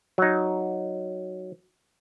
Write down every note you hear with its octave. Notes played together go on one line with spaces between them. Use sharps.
F#3 D#4